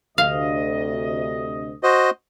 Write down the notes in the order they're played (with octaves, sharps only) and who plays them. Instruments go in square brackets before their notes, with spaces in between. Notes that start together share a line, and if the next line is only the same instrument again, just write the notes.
[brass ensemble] D2 C3 D#5 [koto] F5
[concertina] F#4 C5 D#5